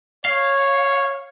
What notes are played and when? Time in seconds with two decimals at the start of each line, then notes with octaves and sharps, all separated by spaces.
0.25 C#5 F5